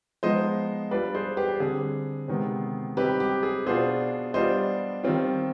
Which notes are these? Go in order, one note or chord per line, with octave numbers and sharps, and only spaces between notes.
F3 G#3 B3 D#4 C5 D#5
G3 D4 F4 B4 D5
G#4 C5
G4 B4
D3 G3 C4 G#4
C3 D#3 G#3 B3
G3 C4 D#4 G4 B4
G4
G#4
B2 B3 D4 F4 G#4 C5
G3 B3 D4 F4 C5 D#5
D#3 G3 C4 F4